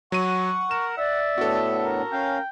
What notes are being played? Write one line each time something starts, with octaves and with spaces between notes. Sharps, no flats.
F#3 F#5 C#6 D#7
A#4 E7
D5 E5
A2 B3 D4 F#4 A4
A#4
C#4 F5 G5